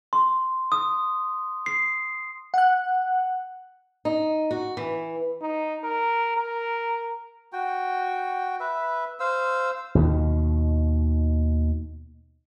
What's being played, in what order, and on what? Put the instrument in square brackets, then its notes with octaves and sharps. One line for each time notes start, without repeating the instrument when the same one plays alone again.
[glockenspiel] C6
D#6
C7
[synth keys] F#5 F#6
[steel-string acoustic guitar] D#4
F#4
E3
[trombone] D#4
A#4
A#4
[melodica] F#4 G5
B4 E5
C5 F5 E6
[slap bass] D#2 B2 D#3